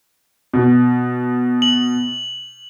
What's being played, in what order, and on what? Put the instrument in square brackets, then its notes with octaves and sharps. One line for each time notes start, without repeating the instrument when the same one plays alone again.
[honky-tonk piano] B2
[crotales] F#7